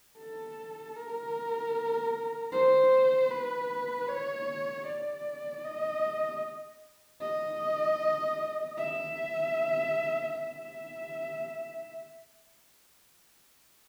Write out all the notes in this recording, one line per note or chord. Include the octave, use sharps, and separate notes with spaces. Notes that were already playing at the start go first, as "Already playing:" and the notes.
A4
A#4
C5
B4
C#5
D5
D#5
D#5
E5
E5